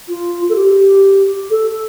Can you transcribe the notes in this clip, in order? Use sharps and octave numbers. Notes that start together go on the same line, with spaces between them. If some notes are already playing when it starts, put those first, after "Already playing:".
F4
A4
G4
A4